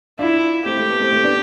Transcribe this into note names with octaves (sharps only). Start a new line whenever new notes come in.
D4 E4 F4
A3 C4 G4
A3
B3
A3 C4
A3 C4
B3 D4